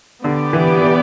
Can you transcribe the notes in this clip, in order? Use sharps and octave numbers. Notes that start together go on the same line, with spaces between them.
D3 B3 G4 D5
E3
E3